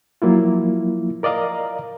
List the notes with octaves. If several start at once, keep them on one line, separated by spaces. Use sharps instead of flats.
F3 F#3 A#3 E4 F4
A#4 D5 D#5 F5 A#5